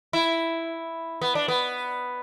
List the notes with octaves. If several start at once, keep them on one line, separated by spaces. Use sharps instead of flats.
E4
B3
D4
B3